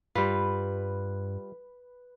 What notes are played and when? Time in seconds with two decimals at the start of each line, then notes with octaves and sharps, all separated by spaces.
0.15 G2 G3 F4 B4